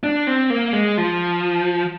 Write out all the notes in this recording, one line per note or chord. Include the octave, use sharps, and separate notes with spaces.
D4
C4
A#3
G#3
F3